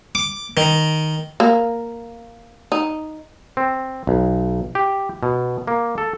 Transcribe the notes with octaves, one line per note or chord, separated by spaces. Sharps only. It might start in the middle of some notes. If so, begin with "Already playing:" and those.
D6
D#3
A#3
D#4
C4
B1
G4
B2
A#3
A4